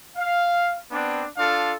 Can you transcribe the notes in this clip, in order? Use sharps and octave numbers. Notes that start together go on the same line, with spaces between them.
F5
B3 C4 D4
D4 F4 A4 F5